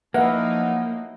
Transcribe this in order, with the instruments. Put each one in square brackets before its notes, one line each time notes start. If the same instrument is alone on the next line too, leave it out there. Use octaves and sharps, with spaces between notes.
[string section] F3 F#3 D#4 [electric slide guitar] A#3 [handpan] B4 E5 [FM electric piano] F#5